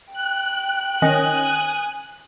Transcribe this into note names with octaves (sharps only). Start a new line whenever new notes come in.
G5 F#6
D#3 C#4 D#5 G#5 D#6